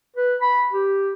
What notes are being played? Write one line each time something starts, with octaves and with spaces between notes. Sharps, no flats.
B4
B5
G4